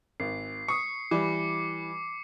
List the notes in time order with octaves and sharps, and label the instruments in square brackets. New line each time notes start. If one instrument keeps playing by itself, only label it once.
[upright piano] G#1 [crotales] C7
[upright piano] C#6 D#6 [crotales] C#7
[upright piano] E3 G3 [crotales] D6